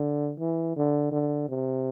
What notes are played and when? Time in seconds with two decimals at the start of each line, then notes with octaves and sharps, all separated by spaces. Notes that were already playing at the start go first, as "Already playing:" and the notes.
Already playing: D3
0.40 E3
0.76 D3
1.12 D3
1.49 C3